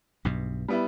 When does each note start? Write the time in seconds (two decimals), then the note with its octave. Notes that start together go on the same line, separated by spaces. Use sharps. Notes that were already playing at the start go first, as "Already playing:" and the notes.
0.25 B1 G2 B2
0.68 G3 B3 E4